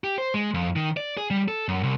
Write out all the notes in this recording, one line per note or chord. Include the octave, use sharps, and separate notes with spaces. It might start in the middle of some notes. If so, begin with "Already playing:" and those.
G4
C5
G#3
F2
D#3
D5
G#4
G3
A4
F#2
C2